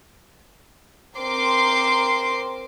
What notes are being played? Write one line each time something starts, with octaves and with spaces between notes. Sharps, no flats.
C4 A#4 C6 D6 C7